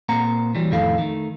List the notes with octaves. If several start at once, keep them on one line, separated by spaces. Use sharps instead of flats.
A#2 A#3 C4 F#5 A#5
E3 F#3 G3
F2 A2 D#3 E4 A4 F5
D#3 A3